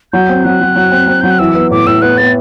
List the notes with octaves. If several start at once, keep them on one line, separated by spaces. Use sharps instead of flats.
F#3 G6
C4
F#3 F#6
F#3
F#3
C4
C4
F#3 G6
F#6
E3 E6
B3
A2 D6
A2 E6
B3 F#6
B3 A6